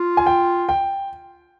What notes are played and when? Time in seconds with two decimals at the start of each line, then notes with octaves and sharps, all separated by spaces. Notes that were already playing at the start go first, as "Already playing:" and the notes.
Already playing: F4
0.17 G#5
0.26 G5
0.69 G5